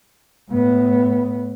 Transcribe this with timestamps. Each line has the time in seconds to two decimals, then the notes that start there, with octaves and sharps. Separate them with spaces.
0.51 A2 B3